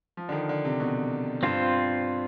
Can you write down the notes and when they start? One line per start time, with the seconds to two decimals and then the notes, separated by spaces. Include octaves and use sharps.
0.17 F3
0.29 D3
0.32 D#3
0.49 D3
0.65 C3
0.80 B2
1.43 G2 C4 F4 C5